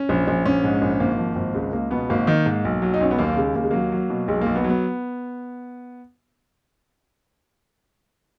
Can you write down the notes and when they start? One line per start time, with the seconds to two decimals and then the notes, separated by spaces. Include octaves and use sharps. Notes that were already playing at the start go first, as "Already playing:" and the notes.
Already playing: C#4
0.09 A#1
0.27 A#1
0.45 A#1 C#4
0.64 G#2
0.81 A#1
1.00 G#1 A#3
1.18 F3
1.36 G#1
1.54 C#2 G#3
1.73 C#2 A#3
1.91 B2 B3
2.10 G#1 A#3
2.27 D#3
2.46 G#2
2.65 B1
2.82 F#3
2.94 D#4
3.00 B1 C#4
3.11 B3
3.19 D#2 A#3
3.37 C#3 G#3
3.55 D#2 A#3
3.64 G#3
3.71 F#3 A#3
3.92 F#3
4.10 B2
4.28 B1 G#3
4.41 B1 A#3
4.55 B3
4.64 F#3
4.70 B3